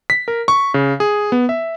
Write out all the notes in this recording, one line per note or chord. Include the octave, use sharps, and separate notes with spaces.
B6
A#4
C#6
C#3
G#4
B3
E5